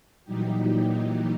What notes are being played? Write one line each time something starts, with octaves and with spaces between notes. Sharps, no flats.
A#2 E3 F#3 G3 D#4 G4